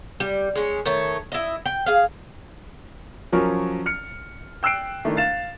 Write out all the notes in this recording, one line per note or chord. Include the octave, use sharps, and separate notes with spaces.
G3
G#3 C#4
D#3 A3 C#5
E4 D#5
G5
G#4 F5
F3 F#3 C#4 A#4
F6 C#7
G5 E6 F#6 C7 D7
D#3 A3 D4 E4
F5 A6 E7